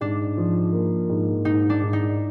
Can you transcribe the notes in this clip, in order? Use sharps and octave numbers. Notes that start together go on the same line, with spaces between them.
G#2 D4
F3
A#3
G#2
G#2 D#4
D4
G#2
D#4